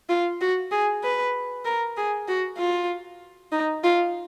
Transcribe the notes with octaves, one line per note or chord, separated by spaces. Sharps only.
F4
F#4
G#4
B4
A#4
G#4
F#4
F4
D#4
F4